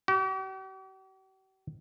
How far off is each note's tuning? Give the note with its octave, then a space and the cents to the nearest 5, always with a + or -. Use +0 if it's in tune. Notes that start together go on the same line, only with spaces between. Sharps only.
G4 -45